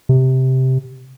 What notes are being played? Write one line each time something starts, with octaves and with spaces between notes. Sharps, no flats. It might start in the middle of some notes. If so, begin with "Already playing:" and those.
C3